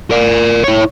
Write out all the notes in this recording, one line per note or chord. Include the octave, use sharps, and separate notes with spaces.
A#4 D5
E4 C#5